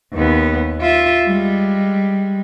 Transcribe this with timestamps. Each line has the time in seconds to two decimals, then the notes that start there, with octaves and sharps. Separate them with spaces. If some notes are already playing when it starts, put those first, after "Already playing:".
0.14 D#2 B3
0.82 F4 E5
1.25 G3 G#3